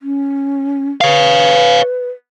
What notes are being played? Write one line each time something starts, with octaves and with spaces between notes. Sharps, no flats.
C#4
B4 C#5 F5